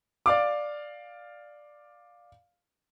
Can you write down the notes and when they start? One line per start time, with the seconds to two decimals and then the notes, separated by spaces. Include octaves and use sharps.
0.26 D5 F5 D6